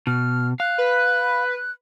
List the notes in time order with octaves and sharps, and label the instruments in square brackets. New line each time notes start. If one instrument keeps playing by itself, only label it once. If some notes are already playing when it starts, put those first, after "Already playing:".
[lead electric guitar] B2 [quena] F6
[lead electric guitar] F5 [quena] F#6
[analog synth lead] B4